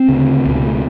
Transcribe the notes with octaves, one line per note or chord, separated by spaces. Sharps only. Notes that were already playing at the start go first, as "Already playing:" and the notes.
Already playing: C4
D2 C#3
C#2 B2 B3
A3